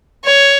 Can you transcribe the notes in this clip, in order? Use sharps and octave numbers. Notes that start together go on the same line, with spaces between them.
C#5